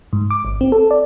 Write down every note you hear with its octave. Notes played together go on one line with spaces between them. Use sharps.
G#2
D6
G#1
C4
A4
D5